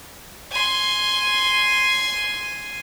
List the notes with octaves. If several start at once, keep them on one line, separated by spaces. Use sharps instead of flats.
G#5 C6